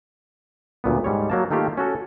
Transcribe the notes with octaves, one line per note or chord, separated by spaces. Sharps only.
D2 A#2 B3
G#2 G3 C#5
F#3 A#3 A5
D#3 A3 A#3 F4 G4
C#4 F#4 A4